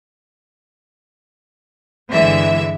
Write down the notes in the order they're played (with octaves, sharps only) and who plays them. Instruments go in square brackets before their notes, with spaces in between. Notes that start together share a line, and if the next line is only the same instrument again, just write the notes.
[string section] G1 D3 E3 G#3 E5